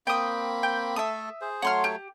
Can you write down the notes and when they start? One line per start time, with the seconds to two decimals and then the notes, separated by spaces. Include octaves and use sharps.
0.07 A#3 C4 G5 B5 D#6
0.63 G5
0.96 A3 A4 E5 D#6
1.41 G#4 C5
1.62 F#3 A3 C#5 F#5 C6 F6
1.84 G4